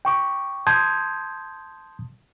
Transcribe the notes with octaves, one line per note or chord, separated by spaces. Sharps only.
G5 C#6 D6
A5 C6 D#6 G6 G#6